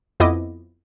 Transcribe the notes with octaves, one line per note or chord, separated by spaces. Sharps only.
F2 B3 E4 D#5 D6